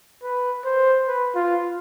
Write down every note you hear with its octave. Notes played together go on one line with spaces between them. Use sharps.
B4
C5
B4
F4